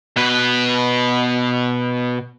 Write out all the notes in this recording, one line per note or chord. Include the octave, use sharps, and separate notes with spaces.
B2 B4